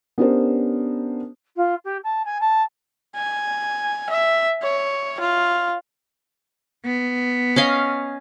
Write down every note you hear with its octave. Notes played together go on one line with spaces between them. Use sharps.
B3 C#4 D4 G4 A#4 C5
F4
G4
A5
G#5
A5
G#5
E5
C#5
F4
B3
C#4 D#5 F5